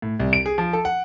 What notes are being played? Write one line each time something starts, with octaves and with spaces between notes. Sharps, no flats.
A2
C2
D7
G#4
F3
A4
F#5